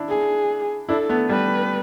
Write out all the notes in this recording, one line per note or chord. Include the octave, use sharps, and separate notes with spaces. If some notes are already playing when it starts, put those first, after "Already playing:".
Already playing: D4 E4
G#4
D4 E4 A4
A3 B3
G3 B4